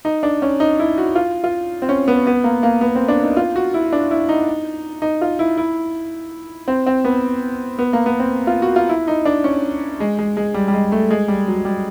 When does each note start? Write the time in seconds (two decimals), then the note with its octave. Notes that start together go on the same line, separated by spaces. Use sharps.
0.05 D#4
0.23 D4
0.42 C#4
0.60 D#4
0.79 E4
0.98 F#4
1.15 F4
1.44 F4
1.82 C4
1.89 C#4
2.08 B3
2.27 B3
2.44 A#3
2.63 A#3
2.81 B3
2.95 C4
3.08 D4
3.23 D#4
3.37 F4
3.56 F#4
3.74 E4
3.92 D4
4.11 E4
4.29 D#4
5.02 D#4
5.21 F4
5.39 E4
5.57 E4
6.68 C4
6.86 C4
7.05 B3
7.79 B3
7.93 A#3
8.06 B3
8.20 C4
8.47 F4
8.62 F#4
8.76 F4
8.89 E4
9.08 D#4
9.25 D4
9.44 C#4
10.00 G#3
10.19 G#3
10.37 G#3
10.54 G3
10.68 G3
10.74 G#3
10.92 A3
11.10 G#3
11.28 G3
11.48 F#3
11.65 G3